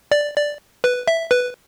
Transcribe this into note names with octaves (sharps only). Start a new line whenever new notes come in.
D5
D5
B4
E5
B4